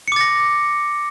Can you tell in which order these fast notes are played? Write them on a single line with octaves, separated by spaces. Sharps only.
C#7 D6 A6 A#6